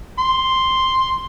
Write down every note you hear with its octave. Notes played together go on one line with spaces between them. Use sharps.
C6